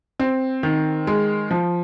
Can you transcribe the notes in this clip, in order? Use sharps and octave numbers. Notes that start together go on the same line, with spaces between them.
C4
D#3
G#3
F3